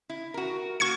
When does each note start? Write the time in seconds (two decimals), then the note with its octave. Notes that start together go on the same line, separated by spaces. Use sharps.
0.09 E4
0.34 F#4 A#4
0.80 A#3 F#4 C#6 G#6 C#7